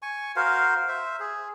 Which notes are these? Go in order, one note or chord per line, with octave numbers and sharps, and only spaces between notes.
G#5 C#6
F#4 A#4 C5 F5
C5 E5
G#4